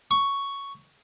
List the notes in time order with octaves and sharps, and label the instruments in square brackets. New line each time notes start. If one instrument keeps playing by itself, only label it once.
[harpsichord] C#6